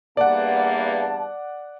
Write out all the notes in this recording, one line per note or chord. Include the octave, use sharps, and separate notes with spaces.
E2 G2 A#3 D5 F#5 A5